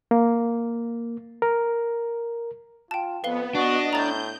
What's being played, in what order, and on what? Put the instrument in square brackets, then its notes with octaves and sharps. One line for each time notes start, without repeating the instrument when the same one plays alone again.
[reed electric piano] A#3
A#4
[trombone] F4 [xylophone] G5 A5
[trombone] F2 [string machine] B3 [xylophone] B4 F5 G7
[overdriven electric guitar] D4 [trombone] F#4 [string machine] D#5
[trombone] A2 [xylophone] A#5 A6 [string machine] G6